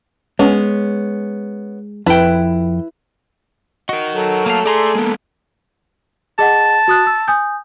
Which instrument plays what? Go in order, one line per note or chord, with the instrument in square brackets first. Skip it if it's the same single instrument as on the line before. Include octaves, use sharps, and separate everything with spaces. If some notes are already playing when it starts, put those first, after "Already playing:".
[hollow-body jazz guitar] G#3 [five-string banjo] B3 C#4
[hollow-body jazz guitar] F2 G5 [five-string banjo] E4 B4
[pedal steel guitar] F#4 [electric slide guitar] A#4 D#5
[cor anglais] F#3 [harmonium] A4
[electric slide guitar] A3 A5 [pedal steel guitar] A#3 F5
[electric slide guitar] A3 [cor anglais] G#4 [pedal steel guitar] D5 A#5 C6
[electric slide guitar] G#3 B3 [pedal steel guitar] A#3
[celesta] G#4 D#5 F#5 [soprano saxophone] A5
[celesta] F#4 D#6 F#6
E6
G#5 D#6 G6